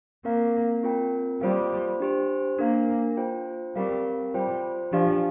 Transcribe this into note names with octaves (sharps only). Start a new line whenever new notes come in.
A#3 C4 A#4 F5
C4 F4 A#4 G5
G3 A#3 F4 C5 F5
D4 G4 C5
A#3 D4 A#4 F5
F4 C5 G5
G3 C4 G4 A#4 F5
G3 F4 C5 G5
F3 D4 G4 D5 F5